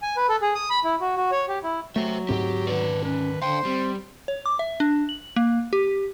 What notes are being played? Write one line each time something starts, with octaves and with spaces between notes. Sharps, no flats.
G#5
B4
A4
G#4
D#6
B5
E4
F#4
F#4
C#5
G4
E4
F#3 A3 C5 E5
D2 G#2 C4 G4
D#3 B4 D5
C#4 B4
D3 C5 F5 G5
G3 C4
C#5
D6
E5
D4
F#7
A#3
G4